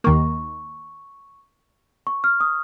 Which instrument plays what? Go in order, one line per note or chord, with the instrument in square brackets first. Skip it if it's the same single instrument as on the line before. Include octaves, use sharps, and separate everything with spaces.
[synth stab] D#2 D#3 A#3 [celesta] C#6
[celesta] C#6
F6
D#6